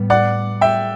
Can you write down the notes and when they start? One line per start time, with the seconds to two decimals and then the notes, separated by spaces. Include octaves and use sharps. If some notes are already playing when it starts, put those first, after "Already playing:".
Already playing: A2 G3 B3
0.10 D5 F#5
0.61 E5 G5